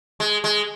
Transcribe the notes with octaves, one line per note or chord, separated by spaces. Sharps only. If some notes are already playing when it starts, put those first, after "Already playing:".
G#3
G#3